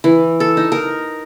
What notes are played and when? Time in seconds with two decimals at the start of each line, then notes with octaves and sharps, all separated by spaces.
0.04 E3
0.40 A4
0.57 D#4
0.72 A#4